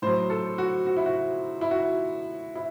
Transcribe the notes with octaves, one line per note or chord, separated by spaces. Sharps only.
A2 F#3 C5
A4
F#4
F#4
E4
F#4
E4
F#4
E4